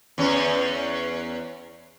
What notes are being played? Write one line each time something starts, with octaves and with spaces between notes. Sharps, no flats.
E2 C#4